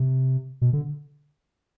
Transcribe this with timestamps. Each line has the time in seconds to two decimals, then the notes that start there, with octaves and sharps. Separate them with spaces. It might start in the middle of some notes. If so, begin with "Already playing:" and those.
Already playing: C3
0.61 B2
0.73 D3